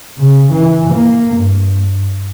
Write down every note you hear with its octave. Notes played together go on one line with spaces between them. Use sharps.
C#3
E3
A#3
G2